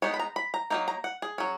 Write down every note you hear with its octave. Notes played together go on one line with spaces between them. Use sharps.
G#3 B3 D#4 C#5
B5
A#5
B5
A#5
F#3 A#3 D#4 A#5
A#5
F#5
G#4
F#3 C#4